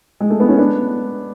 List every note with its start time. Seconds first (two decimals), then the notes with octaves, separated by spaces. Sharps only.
0.20 G#3
0.30 A3
0.40 B3
0.48 C#4
0.58 B3 D4